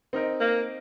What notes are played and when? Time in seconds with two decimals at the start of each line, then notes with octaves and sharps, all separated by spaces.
0.13 C4 D#4 A#4 D#5
0.40 A#3